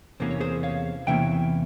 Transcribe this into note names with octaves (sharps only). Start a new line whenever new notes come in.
E2 C3 E3 A#3 C#4 C5
C#5
G#4 C5
C#5 F5
E2 C3 E3 A#3 C#4 E5 G5